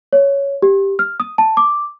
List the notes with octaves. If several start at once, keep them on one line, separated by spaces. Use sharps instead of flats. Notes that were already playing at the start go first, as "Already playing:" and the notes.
C#5
G4
F6
D#6
A5
D6